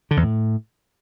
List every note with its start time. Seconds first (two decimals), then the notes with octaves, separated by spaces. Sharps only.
0.11 D3
0.17 E2
0.23 A2